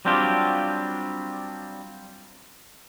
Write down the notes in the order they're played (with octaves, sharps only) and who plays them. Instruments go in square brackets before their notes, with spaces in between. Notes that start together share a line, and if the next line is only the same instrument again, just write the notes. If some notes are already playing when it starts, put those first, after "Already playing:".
[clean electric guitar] F#3 G3 C4 D4 F4 G4